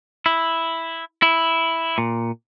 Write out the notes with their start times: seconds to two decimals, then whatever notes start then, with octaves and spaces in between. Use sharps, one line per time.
0.26 E4
1.22 E4
1.98 A#2